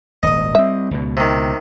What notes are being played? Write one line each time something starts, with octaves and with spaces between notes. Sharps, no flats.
D#1 G#1 D#5 D#6
G3 C4 E5
C#2 B2
C3 D#3